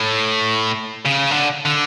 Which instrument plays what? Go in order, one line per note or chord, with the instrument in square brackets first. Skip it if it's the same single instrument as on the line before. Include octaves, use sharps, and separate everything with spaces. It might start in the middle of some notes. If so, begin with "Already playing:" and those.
Already playing: [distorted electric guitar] A2
C#3
D3
D3